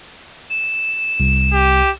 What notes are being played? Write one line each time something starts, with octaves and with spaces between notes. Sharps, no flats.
E7
C2
G4